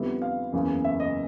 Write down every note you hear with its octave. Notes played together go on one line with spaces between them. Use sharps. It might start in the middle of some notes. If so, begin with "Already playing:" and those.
Already playing: F2 D3 G3 B3 E4
F5
F#1 E2 C#3
E5
D#5